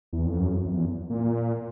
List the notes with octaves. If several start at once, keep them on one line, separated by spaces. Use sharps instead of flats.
E2
F2
F#2
F2
E2
A#2